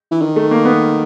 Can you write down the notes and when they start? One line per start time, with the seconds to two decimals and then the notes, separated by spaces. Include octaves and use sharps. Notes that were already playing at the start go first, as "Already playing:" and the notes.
0.11 E3
0.21 D#3
0.36 A3
0.51 A#3
0.65 B3